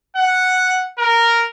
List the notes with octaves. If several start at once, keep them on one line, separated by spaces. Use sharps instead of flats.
F#5
A#4